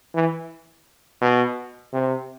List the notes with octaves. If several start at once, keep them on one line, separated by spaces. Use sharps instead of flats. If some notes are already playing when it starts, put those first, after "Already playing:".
E3
B2
C3